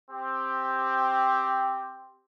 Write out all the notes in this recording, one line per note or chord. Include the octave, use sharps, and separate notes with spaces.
C4 G4